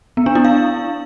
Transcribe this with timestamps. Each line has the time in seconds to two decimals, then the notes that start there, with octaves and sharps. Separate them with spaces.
0.17 B3
0.26 D4
0.35 E4
0.45 F5